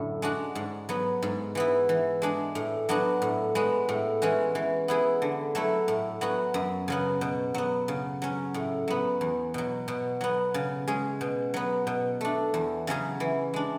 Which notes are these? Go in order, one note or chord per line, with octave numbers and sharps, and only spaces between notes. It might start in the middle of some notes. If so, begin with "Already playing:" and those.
Already playing: F#2 A2 D3 F#3
G#3 D4 F#4
G#2
F#3 B3
G#2
E3 B3 E4
E3
G#3 D4 G#4
A2
F#3 B3 D4 F#4
A2
G#3 B3 F#4
A2
E3 G#3 C#4 F#4
E3
B3 E4 G#4
D3
F#3 A3 E4
A2
F#3 B3 F#4
F#2
C#3 F#3 B3
B2
F#3 B3
C#3
F#3 C#4
A2
F#3 B3
E2
B2 F#3
B2
F#3 B3
C#3
G#3 C#4 G#4
B2
F#3 B3
B2
A3 D4
E2
C#3 F#3 C#4 G#4
E3
G#3 D4